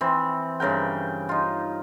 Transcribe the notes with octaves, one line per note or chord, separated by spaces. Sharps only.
E3 C4
G2 C#3 A#4 G5
D#4 F4